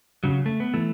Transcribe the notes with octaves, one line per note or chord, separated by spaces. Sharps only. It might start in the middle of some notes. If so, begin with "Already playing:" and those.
C#3 F#3
A3
B3
E3 A3